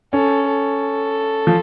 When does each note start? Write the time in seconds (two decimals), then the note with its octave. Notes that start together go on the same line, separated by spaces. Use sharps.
0.13 C#4 A4
0.48 A4
1.47 F3